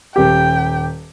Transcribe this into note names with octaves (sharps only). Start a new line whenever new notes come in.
D#1 G4 G5